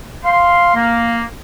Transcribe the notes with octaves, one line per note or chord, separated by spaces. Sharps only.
F5 C6
A#3